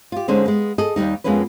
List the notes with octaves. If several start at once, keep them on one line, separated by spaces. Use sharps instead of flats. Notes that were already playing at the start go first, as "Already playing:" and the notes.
F4 G4
D3 G#3 C#4 D#4 C5
G#3 B3
G#4 A4 D#5
D#2 B2 G3 D#4
F2 G#3 A#3 B3 C#4 B4